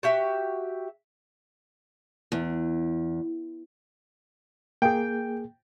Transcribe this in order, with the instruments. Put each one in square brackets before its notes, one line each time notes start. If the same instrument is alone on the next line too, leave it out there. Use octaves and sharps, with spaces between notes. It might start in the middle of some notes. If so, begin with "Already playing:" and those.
[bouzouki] F#4 G4 E5
[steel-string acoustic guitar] E2
[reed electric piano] A#3 G#4 [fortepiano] G5